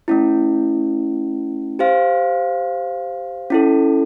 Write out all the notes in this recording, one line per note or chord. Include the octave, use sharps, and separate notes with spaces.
A3 C#4 E4
G4 C5 F5
C#4 E4 A4